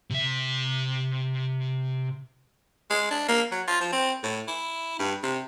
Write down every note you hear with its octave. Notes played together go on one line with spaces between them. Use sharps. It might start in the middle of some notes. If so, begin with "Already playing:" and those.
C3 E5
G#3
D4
A#3
F#3
F4
F3
C4
A2
E4
G2
C3